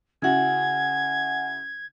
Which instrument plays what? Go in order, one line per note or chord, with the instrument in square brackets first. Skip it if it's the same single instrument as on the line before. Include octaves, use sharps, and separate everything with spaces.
[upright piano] C#3 E4 F#4 [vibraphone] F#5 G#5 [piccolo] G#6